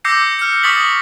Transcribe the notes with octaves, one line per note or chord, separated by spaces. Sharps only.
D6 E6 G6 A#6 C7 C#7
F6 C#7
C#6 D#6 A6 B6 F#7